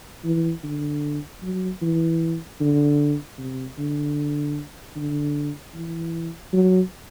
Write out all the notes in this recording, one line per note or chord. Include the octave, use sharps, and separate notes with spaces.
E3
D3
F#3
E3
D3
C3
D3
D3
E3
F#3